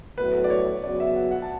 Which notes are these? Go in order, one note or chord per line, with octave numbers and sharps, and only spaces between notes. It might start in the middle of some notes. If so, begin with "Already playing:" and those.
A2 F#3 B3 F#4 A4 B4
D5
C#5
C#3 F#3 B3 F#4 D5
E5
F#5
F#5
A5